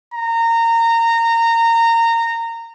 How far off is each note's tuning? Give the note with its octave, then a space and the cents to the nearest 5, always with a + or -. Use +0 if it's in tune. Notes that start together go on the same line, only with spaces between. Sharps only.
A#5 -20